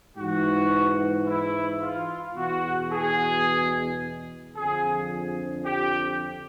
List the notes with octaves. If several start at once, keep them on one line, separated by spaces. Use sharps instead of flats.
G#2 E3 F#4
E4
F4
E2 B2 F#4
G#4
F2 D3 F3 G#4
G4